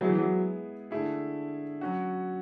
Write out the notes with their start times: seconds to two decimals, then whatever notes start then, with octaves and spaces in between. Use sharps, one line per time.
0.01 F#3 G#3 B3 E4 G#4
0.09 E3
0.18 F#3
0.91 D3 A3 E4 G#4
1.81 F#3 C#4 F#4